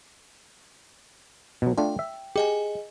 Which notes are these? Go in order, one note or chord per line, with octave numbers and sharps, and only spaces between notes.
B2 F#3
A3 D4 F4 G5
E5
G4 G#4 D#5 G#5